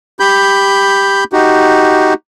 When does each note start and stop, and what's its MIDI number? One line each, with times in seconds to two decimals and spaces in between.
0.20 1.24 67
0.20 1.24 83
0.20 1.24 91
1.33 2.14 63
1.33 2.14 66
1.33 2.14 67